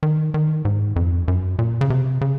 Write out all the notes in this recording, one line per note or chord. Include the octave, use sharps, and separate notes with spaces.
D#3
D#3
G#2
F2
F#2
A#2
C#3
C3
C#3